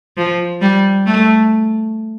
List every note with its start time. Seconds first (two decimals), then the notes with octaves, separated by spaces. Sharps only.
0.17 F3
0.61 G3
1.07 A3